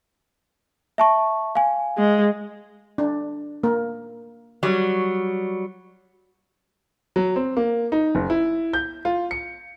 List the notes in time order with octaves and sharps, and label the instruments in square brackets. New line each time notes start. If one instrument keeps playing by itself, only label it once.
[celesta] E5 A5 C#6
F5 G#5
[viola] G#3
[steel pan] D4
A#3 A#4
[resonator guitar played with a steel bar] F#3 G3
[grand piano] F#3
C4
A#3
D#4
F#1
E4
G6
F4
C#7